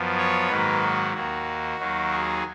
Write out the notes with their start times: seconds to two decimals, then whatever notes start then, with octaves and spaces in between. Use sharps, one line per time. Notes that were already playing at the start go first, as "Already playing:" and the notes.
Already playing: F#2 F3 B3
0.17 C#5
0.49 G#2 D#3 F#3 A#3 B4
0.82 F#4
1.13 D#2 D#3 A#3 F#4
1.78 D#2 D#3 F#3 A#3
2.11 G#4